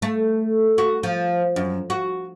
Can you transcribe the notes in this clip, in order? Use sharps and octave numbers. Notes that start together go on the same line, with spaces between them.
A3
F#4
F3
F#2
F#4